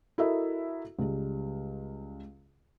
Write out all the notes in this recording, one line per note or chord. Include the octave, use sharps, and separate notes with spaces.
E4 F#4 A4 A#4 D#5 E5
C#2 G3